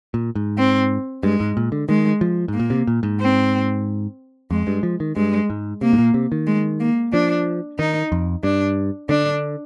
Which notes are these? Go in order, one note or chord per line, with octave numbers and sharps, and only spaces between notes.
A#2
G#2
C4
G2 G#3
G#2
A#2
D3
D#3 G#3
F3
G#2
A#3
A#2
C3
A#2
G#2
C4
F2 G#3
G2
F3
D#3
G2 G#3
G#2
C3 A#3
G#2
A#2
C3
D#3
G#3
A#3
F3 D4
D#3 D#4
F2
G2 D4
D3 D4